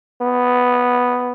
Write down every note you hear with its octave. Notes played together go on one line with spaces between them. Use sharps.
B3